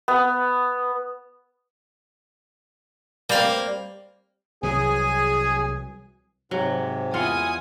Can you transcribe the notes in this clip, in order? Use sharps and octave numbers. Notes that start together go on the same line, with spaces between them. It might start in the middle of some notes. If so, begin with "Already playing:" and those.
B3
G3 A#3 C4 F5
C2 E3 F#3 G#4 G#5
G#2 C3 F#3
E2 E4 F4 F#5 G#5 D#6